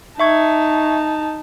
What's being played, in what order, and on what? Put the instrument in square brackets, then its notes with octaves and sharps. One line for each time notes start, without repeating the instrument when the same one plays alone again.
[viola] D#4 A5 [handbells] E5 C#6 G#6